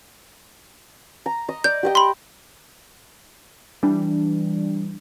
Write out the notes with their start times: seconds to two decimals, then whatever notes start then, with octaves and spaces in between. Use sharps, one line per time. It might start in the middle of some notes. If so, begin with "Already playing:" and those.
1.26 A#5
1.49 D#5
1.64 D5 G6
1.83 G4 D#5 G5
1.95 B5 C6
3.83 E3 G3 D4